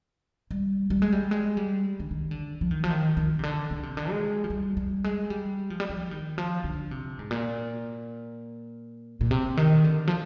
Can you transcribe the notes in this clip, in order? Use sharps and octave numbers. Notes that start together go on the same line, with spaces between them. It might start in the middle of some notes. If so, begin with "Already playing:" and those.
G3
G3
G#3
G3
G#3
G3
D3
D#3
D3
F3
D#3
F3
D#3
D#3
C3
D3
D3
C3
D3
G#3
F3
G3
G3
G#3
G3
F3
G3
F3
D#3
F3
D3
C3
G#2
A#2
A#2
C3
D#3
D3
F3